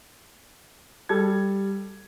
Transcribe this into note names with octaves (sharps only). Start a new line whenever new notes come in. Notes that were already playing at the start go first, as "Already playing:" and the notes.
G3 A4 G#6